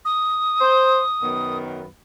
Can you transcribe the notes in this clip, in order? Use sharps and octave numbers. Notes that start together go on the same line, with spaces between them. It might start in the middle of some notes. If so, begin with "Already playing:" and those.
D#6
C5
F#2 D#3 B3